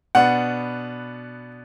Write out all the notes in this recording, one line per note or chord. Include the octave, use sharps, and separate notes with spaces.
B2 B3 D4 F#5